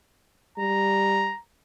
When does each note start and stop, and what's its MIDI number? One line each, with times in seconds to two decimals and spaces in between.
0.58 1.31 55
0.58 1.40 82